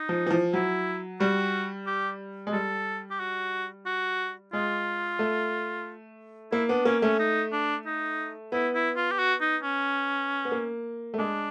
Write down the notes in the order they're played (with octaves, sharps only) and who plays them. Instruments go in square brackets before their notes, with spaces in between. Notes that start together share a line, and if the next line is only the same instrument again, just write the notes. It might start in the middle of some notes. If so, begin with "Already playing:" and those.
Already playing: [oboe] D#4
[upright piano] F3
E3
F3
[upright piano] F#3 [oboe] E4
[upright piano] G3 [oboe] F#4
[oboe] G4
[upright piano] G#3
[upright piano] G3 [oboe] A4
[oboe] G4
F#4
F#4
[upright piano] G#3 [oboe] F4
[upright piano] A3
[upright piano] A#3 [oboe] E4
[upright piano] B3 [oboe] D4
[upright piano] A#3 [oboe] C#4
[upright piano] A3 [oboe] C#4
[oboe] D#4
D4
D#4
[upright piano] B3 [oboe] E4
[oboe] E4
F4
G4
F#4
D#4
C#4
[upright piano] B3
A#3
A3
[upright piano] G#3 [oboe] D4